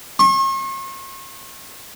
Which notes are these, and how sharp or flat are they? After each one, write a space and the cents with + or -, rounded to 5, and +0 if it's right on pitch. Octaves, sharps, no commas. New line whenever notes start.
C#6 -45